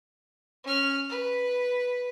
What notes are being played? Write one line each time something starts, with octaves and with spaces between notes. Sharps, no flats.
C#4 F6
B4